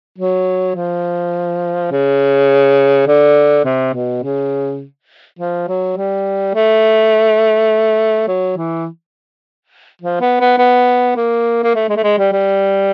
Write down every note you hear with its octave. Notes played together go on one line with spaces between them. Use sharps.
F#3
F3
C#3
D3
C3
B2
C#3
F3
F#3
G3
A3
F#3
E3
F3
B3
B3
B3
A#3
A#3
A3
G#3
A3
G#3
G3
G3